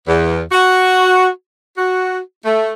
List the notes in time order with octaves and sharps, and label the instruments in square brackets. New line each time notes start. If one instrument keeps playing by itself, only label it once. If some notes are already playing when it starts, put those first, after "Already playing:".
[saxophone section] E2
F#4
F#4
A3